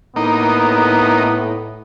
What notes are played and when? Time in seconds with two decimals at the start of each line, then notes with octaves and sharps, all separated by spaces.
0.16 A2 A#3 B3 D#4